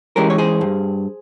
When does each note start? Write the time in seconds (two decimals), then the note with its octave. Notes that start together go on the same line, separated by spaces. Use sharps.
0.16 E3 G#3 C#4 G4 A#4
0.30 C#5
0.38 G#4 C5
0.61 G2